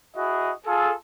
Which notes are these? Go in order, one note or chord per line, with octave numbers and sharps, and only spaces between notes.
E4 F#4 G#4 D#5
F4 G#4 A4